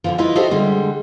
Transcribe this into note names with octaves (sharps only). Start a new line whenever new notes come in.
D3 E3 F3
E4 F4 B4 D#5 E5
F#4 G4 A4 C5 D#5 E5
D3 G3 G#3